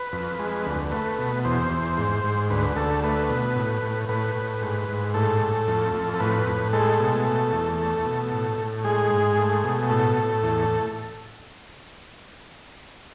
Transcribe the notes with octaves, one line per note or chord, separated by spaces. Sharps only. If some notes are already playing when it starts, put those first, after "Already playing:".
Already playing: B4
F2
G#3
D2
A3 B4
B2
E2 C5
E2
G#2
G#2
D2 B4
D2 A4
A3 B4
B2
A2
A2
A2 B4
A2
G#2
G#2
A2 A4
A2
F2
F2
A4
A2 B4
A2
G#3 A4
B2
A3
E2
A3
B2
A2
A2
G#3 G#4
G#2
A3
B2
A2 A4
A2
E2